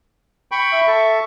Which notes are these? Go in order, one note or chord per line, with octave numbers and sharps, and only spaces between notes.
G5 B5 C#6
E5
A4 C#6